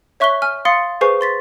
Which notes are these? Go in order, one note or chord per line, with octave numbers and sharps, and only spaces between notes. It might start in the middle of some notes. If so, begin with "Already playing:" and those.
C#5 E5 C#6 F#6 B6 G7
G#5 F6
F5 C6 D#6 A6 C#7
G#4 B4 C5 G#5 C#6 C7
C6 A6 B6